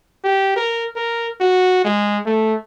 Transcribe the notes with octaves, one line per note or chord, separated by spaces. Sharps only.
G4
A#4
A#4
F#4
G#3
A3